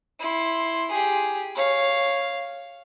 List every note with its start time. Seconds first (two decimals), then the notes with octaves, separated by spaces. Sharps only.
0.20 E4 C6
0.91 G4 G#4
1.56 C#5 F5